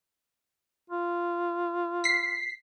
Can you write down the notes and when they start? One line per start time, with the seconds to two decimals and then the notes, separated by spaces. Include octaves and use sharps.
0.90 F4
2.04 B6 C7